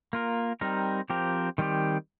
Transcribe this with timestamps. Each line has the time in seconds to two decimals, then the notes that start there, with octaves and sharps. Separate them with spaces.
0.13 A#3 F4 A#4
0.61 G3 C4 D#4 A#4
1.10 F3 C4 G4 A#4
1.58 D#3 G3 C4 G4